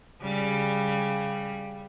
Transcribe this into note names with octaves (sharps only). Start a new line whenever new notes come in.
C#3 G3